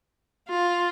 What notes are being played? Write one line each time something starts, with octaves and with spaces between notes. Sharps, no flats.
F4